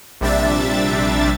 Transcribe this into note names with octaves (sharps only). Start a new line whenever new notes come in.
A#1 C3 G3 D4 E5 A6